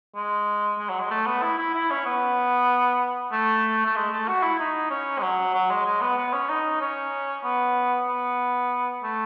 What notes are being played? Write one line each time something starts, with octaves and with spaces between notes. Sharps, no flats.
G#3
G#3
F#3
G#3
A3
B3
E4
E4
E4
C#4
B3
A3
A3
G#3
A3
F#4
E4
D#4
C#4
G#3
F#3
F#3
G#3
G#3
B3
B3
C#4
D#4
C#4
B3
B3
A3